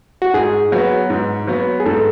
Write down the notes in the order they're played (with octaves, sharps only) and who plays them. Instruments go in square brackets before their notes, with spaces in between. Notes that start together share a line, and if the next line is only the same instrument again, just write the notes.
[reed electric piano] F#4
[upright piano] G#2 [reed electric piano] G#4
[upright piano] F#3 B3
G#2
F#3 B3
[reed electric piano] G#4
[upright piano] G#2 [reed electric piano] A4